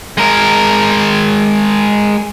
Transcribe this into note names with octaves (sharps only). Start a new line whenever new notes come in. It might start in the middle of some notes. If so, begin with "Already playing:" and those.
G#3 A#4